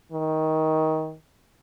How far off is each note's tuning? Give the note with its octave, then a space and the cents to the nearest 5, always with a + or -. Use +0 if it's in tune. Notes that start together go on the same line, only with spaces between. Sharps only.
D#3 +20